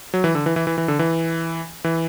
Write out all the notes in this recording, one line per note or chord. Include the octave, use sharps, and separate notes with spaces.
F#3
E3
D3
E3
E3
E3
E3
D3
E3
E3